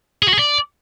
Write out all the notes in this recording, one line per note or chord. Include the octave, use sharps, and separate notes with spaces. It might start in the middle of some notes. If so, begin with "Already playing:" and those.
G#4
F#4
G#4
D5